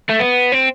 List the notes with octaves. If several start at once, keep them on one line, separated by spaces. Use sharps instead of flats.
A3
B3
C4